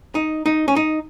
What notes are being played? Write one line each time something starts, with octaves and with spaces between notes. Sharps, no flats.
D#4
D#4
C#4
D#4